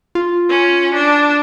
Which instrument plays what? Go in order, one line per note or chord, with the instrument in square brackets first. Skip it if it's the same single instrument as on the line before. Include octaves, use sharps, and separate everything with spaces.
[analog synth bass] F4
[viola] C#4
D4